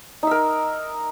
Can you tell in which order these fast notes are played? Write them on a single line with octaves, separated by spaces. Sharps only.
D#4 E5 A#4